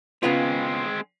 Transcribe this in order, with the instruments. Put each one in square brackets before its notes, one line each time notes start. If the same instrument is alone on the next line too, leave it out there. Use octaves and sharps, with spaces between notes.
[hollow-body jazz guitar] C#3 B3 F4 [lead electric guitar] G#3 C4